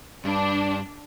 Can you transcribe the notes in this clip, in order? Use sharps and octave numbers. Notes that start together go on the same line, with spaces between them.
G2 D4